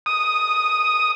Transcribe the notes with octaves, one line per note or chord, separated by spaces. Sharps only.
D#6